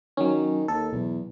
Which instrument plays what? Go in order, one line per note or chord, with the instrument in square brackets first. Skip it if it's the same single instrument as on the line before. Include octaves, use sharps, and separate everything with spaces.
[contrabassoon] D#3 [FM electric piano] F#3 C#4
[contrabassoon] D#2 [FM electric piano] A4
[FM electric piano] B1 [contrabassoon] E2